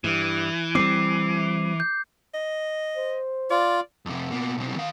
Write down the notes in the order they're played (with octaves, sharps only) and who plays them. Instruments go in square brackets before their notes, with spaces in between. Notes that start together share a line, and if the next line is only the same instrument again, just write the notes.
[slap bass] G2 [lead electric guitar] E3
[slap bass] G3 A3 C4 [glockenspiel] D6 C7
[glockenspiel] G6
[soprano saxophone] D#5
[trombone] C5
[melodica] F4 [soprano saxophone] D5
[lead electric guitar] F2 C3
B2 A#3
B1 C3
D#3 F5